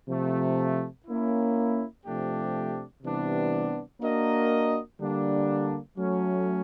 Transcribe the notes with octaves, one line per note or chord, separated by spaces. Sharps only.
C3 F3 A3
A#3 C#4 E4
C3 F3 A3 D4 G4
C3 E3 G3 B3 D4
A#3 D4 F#4 A#4 D#5
D3 G3 A#3 D4
F#3 A3 C#4